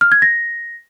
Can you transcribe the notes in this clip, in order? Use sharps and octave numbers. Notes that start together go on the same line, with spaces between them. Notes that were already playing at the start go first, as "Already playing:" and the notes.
F6
G#6
A#6